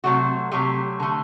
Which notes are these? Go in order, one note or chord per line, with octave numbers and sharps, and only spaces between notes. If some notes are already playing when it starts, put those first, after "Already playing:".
C3 F#3 A3 F#4
C3 F#3 A3 G4
D3 A3